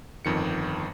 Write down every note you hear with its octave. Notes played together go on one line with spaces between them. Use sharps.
G1 F2 D#3 C#7